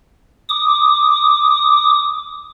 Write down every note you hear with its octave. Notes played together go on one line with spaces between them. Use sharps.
D6 D#6